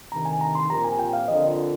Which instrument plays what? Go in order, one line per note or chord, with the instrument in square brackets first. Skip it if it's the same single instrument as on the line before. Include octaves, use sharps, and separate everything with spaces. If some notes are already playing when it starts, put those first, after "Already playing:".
[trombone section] D2 C3 D#3 [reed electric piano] A#5
[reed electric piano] G#5
A#5
C6
[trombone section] A#2 F3 C4 G4 A#4 [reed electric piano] A#5
[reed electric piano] G#5
G5
F5
[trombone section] D3 F3 C4 F4 A#4 [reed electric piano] D#5